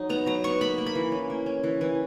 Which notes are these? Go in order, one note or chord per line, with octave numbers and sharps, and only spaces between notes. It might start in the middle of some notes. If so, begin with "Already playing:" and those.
Already playing: F#3 D#4
B3 A#5
F#3 A#5
B3 C#6
A#3 B5
A#3
B5
E3
C#4
A#3
C#4
E3
E3